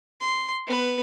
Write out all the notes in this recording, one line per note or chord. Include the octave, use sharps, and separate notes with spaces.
C6
B3 B4